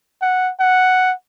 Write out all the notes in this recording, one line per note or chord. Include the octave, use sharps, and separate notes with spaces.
F#5
F#5